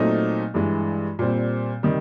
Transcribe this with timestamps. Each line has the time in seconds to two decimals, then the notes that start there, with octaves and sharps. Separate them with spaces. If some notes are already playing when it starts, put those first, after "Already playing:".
Already playing: A#2 F#3 A3 C4 D#4
0.54 G2 E3 G#3
1.19 A#2 G3 C4
1.83 C3 D#3 G3